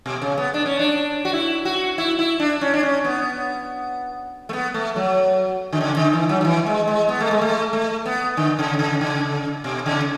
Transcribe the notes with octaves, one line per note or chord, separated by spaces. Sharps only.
B2
C#3
B3
D4
C#4
D4
F#4
E4
F#4
E4
E4
D4
C#4
D4
C#4
B3
A3
B3
A3
F#3
D3
C#3
D3
E3
F#3
F#3
E3
G#3
G#3
B3
A3
G#3
A3
A3
B3
D3
C#3
C#3
C#3
B2
C#3